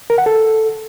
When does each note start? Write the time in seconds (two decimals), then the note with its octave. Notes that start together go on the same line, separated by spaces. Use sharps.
0.10 A#4
0.18 F#5
0.26 A4